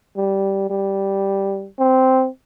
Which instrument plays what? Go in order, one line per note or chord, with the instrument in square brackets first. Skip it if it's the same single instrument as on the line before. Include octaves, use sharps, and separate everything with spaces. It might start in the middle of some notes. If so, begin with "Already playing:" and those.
[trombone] G3
G3
C4